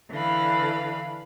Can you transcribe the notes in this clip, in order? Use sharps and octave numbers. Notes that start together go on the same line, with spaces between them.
D3 E3 F5 B5